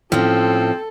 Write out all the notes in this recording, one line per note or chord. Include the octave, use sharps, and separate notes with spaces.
A2 F3 C4 C#4 A4